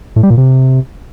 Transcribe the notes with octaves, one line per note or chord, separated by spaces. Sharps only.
A2
G3
A#2
C3